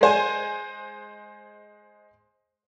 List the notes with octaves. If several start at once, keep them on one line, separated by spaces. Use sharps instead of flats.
G#3 C5 G#5